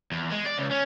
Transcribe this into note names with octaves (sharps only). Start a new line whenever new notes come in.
E2
G#3
D5
C#2
C#4